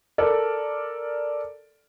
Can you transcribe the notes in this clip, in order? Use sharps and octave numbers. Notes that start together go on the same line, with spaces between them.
A4 A#4 D5